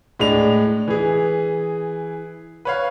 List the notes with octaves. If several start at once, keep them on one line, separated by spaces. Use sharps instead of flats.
A2 G#3 D4 F7
E3 G#4
B4 C#5 F5